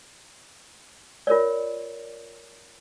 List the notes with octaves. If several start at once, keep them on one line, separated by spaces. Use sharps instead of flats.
F4 A#4 C#5 D5